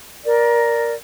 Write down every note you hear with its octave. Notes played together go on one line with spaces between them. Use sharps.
A#4 D5